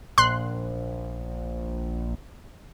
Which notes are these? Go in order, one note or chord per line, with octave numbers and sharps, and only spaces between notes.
A#1 C6 F#6